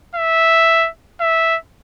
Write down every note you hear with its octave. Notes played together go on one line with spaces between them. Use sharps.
E5
E5